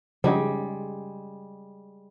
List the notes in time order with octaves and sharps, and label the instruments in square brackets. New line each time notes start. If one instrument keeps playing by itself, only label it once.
[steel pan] C#3 D#4 [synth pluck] F3 D4 F#4 [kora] G3 G#3